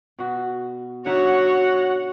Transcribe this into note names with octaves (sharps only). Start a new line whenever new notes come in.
B2 F#4
D3 D#4 F#4 C#5 E5 F#5